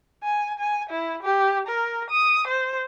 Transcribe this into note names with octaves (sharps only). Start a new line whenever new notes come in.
G#5
G#5
E4
G4
A#4
D#6
C5